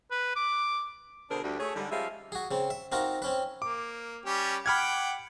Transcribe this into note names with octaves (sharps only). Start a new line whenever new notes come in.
B4
D6
B2 D3 D4 G#4 A#4 C5
D2 G3
A3 G#4 C#5
G#2 D3 G3
F3 G3 G#3 C#4 E5 F5
F#4 G#4
C#3 C4
E5
C4 D#4 F4 F#4 A#4 A#5
C4 C#4 B4
A#3 D6
G3 C#4 G4
F#5 G5 B5 D6 F6 G#6